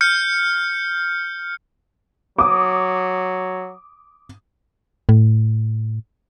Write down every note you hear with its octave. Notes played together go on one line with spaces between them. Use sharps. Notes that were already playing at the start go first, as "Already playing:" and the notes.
F6 G6 C#7
F#3 D6 D#6
A2